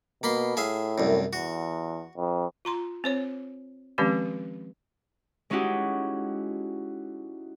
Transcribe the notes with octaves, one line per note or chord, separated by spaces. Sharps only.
B2 A#3 B5 C6
A2 G#4 E5 F5
C2 F#2
E2 F#4
F2
F4 A#5 C6
C4 C5 C#5
D#3 F3 G#3 C4 C#4 G4
G#3 C#4 D#4 E4 F#4 G4